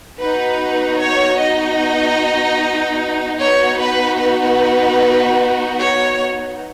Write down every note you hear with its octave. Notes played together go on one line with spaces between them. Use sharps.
B3 D#4 F#4 B4
C#5
D#4 D#5
B3 D#4 F#4 C#5
B4
B4
C#5